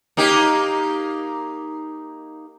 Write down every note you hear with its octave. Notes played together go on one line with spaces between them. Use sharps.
A#3 D#4 G4